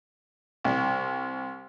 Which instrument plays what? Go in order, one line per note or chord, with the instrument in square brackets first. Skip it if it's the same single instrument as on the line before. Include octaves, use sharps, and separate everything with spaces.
[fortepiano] C2